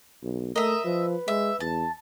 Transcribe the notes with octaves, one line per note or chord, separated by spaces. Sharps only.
B1
A3 A#4 D#5 E5
F3 B4
G#3 E5
E2 A5